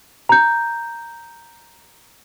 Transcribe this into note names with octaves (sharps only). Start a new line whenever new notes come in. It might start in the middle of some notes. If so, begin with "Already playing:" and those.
A#5 G6